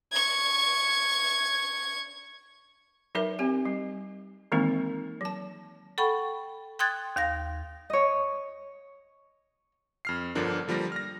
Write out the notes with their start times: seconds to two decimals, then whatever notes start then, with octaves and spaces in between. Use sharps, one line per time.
0.12 C#6 G#6
3.15 F#3 D#4 A#4 B4 E5
3.39 C4 G4 G#5
3.65 G3
4.52 D#3 E3 G#3 A#3 C4 D#4
5.21 F#3 A5
5.98 A4 F#5 G5 B5 C#6
6.79 G5 C6 D#6 F#6 G#6 A6
7.16 D#2 F5 A#6
7.90 C#5 D#5
10.05 F2 F6 C7
10.35 G1 D3 F3 D4 A#4
10.68 D3 F3 G3 A#3 A#6
10.92 F6 A#6